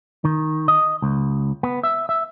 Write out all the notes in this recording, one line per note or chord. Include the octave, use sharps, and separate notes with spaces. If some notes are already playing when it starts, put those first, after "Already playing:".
D#3
D#5
C#2
B3
E5
E5